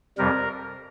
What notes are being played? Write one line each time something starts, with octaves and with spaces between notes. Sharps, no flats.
F2 C3 G3 A#4